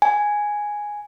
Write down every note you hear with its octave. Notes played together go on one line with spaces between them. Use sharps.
G#5